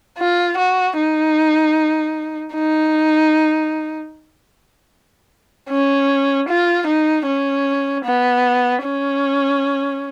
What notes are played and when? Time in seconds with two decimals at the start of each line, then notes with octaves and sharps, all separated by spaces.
0.18 F4
0.57 F#4
0.97 D#4
2.54 D#4
5.69 C#4
6.48 F4
6.87 D#4
7.26 C#4
8.05 B3
8.84 C#4